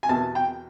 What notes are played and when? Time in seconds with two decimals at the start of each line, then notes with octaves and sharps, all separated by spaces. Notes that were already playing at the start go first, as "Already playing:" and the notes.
0.03 G#5
0.09 E2 B2 A5
0.35 G5